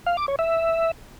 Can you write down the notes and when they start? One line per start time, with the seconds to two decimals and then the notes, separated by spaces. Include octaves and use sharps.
0.06 F5
0.17 D6
0.28 C#5
0.39 E5